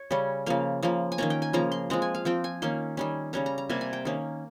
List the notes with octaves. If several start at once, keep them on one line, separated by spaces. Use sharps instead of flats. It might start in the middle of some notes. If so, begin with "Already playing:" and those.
Already playing: C#5
C#3 G3 C#4
C#3 F3 A#3 F5
C#3 F3 A#3
G#5
D#3 A#3 C#4 A#5
G5
G#5
C#3 F3 A#3 A#5
C6
F3 G#3 C4 A#5
G#5
F5
F3 C4 G5
G#5
D#3 A#3 C#4 C6
D#3 G3 C#4
C#3 G3 C#4 A#5
A#5
A#5
C3 G3 A#3 G#5
G#5
G5
D#3 A#3 C#4